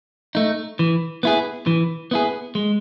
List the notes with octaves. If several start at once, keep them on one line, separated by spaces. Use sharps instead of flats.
A3 D#4
E3
B3 E4 G#4
E3
B3 E4 G#4
G#3